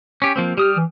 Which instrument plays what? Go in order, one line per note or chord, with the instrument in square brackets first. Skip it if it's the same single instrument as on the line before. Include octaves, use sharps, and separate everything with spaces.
[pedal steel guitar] C#4 G4
F3 A#3 C4
[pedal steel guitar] G3 D#6 F6 [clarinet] G4
[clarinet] E3